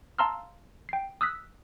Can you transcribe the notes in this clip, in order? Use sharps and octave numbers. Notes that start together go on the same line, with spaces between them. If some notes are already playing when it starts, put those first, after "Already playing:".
F5 A5 A#5 C6 E6 F6
G5 C7
D#6 E6 F#6 B6